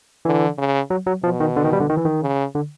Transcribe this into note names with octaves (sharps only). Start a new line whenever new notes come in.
D3 E3
C#3
F#3
F#3
B2 F3
D#3
D3
D#3
G3
D3
D#3
E3
D#3
C#3
D3